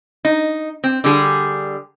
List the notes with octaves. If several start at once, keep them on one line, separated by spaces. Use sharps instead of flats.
D#4
C4
D3 G3 G#4